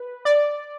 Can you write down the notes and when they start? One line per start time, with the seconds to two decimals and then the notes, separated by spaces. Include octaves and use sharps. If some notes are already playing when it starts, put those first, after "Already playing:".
Already playing: B4
0.25 D5